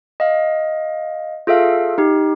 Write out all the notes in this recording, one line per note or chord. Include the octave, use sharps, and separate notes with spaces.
D#5 F5
F4 G#4 A4 E5 F5
D#4 G4